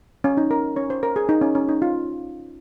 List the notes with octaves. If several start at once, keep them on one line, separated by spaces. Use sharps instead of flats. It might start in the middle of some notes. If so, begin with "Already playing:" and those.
C#4
D#4
A#4
C#4 C#5
C5
A#4
G#4
D#4
C#4
C#4
D#4
F4